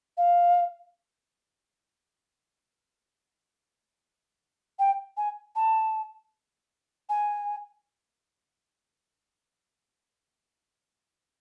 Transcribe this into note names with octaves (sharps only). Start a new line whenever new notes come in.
F5
G5
G#5
A5
G#5